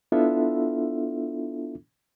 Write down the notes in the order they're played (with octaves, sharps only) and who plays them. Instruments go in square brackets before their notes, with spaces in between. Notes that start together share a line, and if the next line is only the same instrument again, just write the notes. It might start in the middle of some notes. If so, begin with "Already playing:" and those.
[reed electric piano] B3 D4 E4 F4 A4 E5